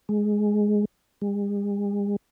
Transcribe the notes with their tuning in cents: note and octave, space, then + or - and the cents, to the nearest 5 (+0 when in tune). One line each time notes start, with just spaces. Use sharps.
G#3 +5
G#3 -45